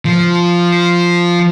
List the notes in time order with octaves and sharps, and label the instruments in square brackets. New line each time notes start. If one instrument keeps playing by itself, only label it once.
[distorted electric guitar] F3